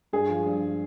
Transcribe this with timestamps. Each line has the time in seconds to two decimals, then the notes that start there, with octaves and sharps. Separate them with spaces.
0.13 G2 G#4
0.29 F3
0.46 G2